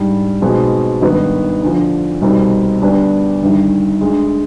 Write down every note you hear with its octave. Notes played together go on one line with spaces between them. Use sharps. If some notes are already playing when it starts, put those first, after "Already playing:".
Already playing: G#2 G3 D4
B1 B2 G#3 C4
G#1 G2 D#3 B3 D#4
D2 D3 F3
C2 B2 G3 C4 D#4
D2 D3 G3 B3 D4
G1 G2 D#3
D2 D3 G#3